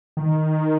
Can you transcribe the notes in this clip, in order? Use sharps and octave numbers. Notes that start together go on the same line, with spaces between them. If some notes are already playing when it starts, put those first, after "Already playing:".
D#3